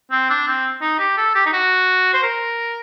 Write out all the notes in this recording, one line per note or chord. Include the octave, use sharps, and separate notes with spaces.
C4
D4
C4
D#4
G4
A4
G4
D#4
F#4
C5
A#4